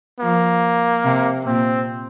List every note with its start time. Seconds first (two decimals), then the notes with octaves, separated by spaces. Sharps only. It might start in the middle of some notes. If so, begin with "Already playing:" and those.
0.20 F3 A#3
1.04 C3
1.45 A#2 C4